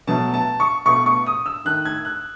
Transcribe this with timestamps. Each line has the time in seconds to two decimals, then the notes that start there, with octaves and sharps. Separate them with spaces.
0.07 B2 F#3 A3 A5
0.34 A5
0.60 C#6
0.86 B2 A3 C#6
1.06 C#6
1.27 D#6
1.46 E6
1.65 D#3 A3 F#6
1.85 G#6
2.05 F#6